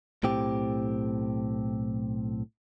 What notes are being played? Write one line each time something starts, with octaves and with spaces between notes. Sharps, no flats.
B1 A2 C4 G4